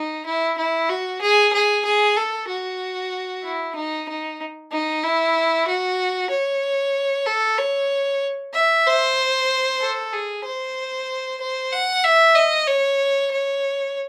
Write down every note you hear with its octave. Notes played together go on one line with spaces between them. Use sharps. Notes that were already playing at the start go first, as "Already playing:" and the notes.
Already playing: D#4
E4
E4
F#4
G#4
G#4
G#4
A4
F#4
E4
D#4
D#4
D#4
E4
F#4
C#5
A4
C#5
E5
C5
A4
G#4
C5
C5
F#5
E5
D#5
C#5
C#5